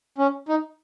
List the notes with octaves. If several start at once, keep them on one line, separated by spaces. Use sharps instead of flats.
C#4
D#4